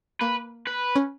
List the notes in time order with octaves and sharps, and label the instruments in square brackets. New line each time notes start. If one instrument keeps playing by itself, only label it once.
[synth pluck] A#3 [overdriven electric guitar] B4
[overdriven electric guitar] B4
[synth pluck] C#4